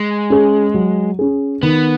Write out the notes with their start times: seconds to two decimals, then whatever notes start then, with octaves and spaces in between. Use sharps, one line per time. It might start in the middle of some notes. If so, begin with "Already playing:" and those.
Already playing: G#3
0.30 C#4 G#4
0.74 F#3
1.19 C#4 G#4
1.63 D#3 B3